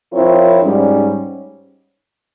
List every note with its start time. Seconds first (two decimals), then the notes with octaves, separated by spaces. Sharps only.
0.12 F3 C4 E4 A#4 C#5
0.60 G#2 G3 C#4